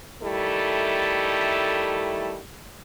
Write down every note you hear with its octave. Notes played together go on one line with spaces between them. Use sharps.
D#3 G3 A3 E4 A4